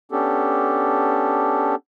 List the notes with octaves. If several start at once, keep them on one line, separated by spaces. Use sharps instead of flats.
B3 C#4 D4 G4 A4